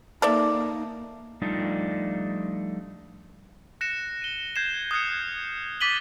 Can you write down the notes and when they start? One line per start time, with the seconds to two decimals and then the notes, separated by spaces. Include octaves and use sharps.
0.22 A#3 D#4 A4 D5 E5
1.42 F3 G3 A3 D4 D#4 F4
3.81 F#6 A#6 C#7 E7
4.22 D#7 G7
4.56 G6 G#6 C7 E7
4.91 D#6 F6 F#6 G#6 C#7
5.09 G6
5.80 D6 A6 B6 D#7 F#7 G7